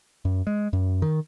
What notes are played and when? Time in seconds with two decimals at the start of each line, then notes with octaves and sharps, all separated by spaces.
0.25 F#2
0.47 G#3
0.73 F#2
1.02 D#3